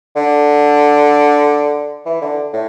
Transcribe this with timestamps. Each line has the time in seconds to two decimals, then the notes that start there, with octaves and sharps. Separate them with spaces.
0.16 D3
2.06 E3
2.22 D3
2.53 A2